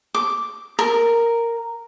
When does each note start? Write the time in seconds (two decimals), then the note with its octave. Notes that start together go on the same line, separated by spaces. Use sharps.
0.14 D6
0.79 A#4